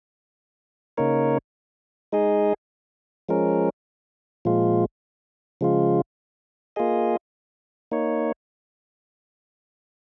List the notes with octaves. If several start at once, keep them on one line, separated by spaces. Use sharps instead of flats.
C#3 A#3 D#4 A#4 C#5
G#3 D#4 G#4 D#5
F3 G#3 C#4 A#4
A#2 F3 G#3 F4
C#3 F3 G#3 F4
A#3 F4 G#4 D#5
A#3 D#4 C#5